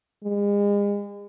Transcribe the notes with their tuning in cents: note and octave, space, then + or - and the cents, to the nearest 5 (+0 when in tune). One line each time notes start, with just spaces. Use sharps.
G#3 -40